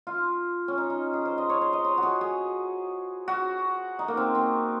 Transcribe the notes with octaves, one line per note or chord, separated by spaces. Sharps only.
F4
C#4
D#4
D#4
G#4
C5
D#5
C#5
C5
D#5
C#5
F#4
G#4
G#4
F#4
D#4
A#3
C4
C4